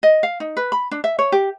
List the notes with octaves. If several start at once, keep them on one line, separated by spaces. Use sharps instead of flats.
D#5
F5
D#4
B4
B5
D4
E5
C#5
G4